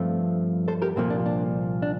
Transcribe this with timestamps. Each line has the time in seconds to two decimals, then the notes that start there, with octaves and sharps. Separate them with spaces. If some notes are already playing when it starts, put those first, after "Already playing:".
Already playing: G2 F3 A3 C4
0.68 A4 C5
0.82 G4 A#4
0.96 C2 A#2 F3 A#3 C4
1.10 D4
1.26 D4
1.82 D4